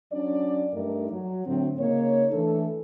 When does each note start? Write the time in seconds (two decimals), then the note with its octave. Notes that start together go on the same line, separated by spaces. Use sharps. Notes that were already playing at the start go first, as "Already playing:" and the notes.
0.13 F#3 C#4 D4 D5
0.73 G2 A3 D#4 A#4 D5
1.11 F#3
1.46 A2 D3 F#3 C4
1.80 C#3 A#3 D#4 C#5
2.33 E3 A3 D4 A4